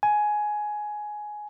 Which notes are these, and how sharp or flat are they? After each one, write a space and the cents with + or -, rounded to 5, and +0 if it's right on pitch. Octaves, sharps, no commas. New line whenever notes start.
G#5 +15